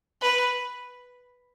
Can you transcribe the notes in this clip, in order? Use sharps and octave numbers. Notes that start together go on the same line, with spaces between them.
B4